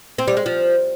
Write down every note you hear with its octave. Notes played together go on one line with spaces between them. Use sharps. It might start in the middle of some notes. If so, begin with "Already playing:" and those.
C4
G3
G#3
F3